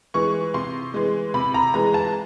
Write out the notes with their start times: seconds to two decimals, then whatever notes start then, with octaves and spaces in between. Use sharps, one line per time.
0.14 E3 G#3 C#6
0.54 C3 C6
0.94 E3 G#3
1.34 C3 B5
1.54 A#5
1.74 E3 G#3 A#5
1.94 A5